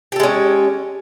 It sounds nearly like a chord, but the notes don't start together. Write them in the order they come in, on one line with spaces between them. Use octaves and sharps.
G4 A4 G#3 C#4